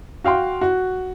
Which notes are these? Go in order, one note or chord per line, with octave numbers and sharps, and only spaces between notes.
F#4 F5 G5 C6
F#4